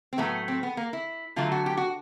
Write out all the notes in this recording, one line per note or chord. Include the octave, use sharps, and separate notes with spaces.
C4
A2 F#3 A3 B3
C4
B3
A#3
E4
D3 F#3 A3 F4
F#4
G4
F#4